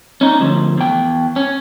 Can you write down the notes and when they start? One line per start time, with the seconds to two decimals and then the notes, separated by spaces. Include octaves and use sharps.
0.21 C#4 D#4
0.40 D2 F3
0.78 E2 G5
1.36 C#4